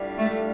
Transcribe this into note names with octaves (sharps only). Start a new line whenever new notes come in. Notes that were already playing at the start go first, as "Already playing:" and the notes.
Already playing: A2 G3 D4 F4
A3